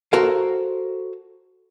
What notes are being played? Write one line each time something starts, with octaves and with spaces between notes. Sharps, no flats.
F#4 A4 A#4 C5 F5